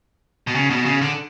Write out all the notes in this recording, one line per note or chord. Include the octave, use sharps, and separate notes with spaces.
B2
C#3
B2
C#3
D3